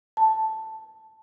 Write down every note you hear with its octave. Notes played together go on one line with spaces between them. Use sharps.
A5